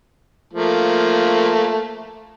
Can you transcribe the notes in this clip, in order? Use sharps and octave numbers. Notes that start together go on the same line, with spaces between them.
F3 A3 A#3